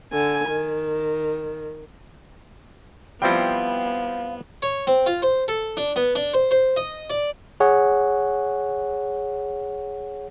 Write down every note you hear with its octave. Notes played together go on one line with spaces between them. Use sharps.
D3 G#5
D#3
F3 G3 B3 C4 E4 F5 G5
C#5
C4
F4
C5
A4
D4
B3
D4
C5
C5
D#5
D5
G#4 C#5 F#5